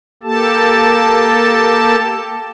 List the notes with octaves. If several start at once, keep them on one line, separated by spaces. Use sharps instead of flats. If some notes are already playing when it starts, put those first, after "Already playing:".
A#3 G4 A4 A5